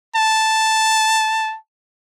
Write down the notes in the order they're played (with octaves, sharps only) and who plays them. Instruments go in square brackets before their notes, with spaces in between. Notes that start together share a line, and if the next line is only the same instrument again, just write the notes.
[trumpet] A5